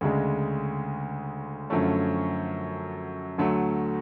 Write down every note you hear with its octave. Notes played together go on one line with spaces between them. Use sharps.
D2 C#3 G#3 D4
F#2 D3 F3 A3 C#4
D2 D3 F#3 A3